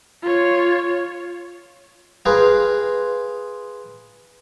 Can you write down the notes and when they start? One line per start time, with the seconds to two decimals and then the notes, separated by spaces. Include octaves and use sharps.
0.22 F4 C#5
2.25 F4 G#4 B4 G5 A#5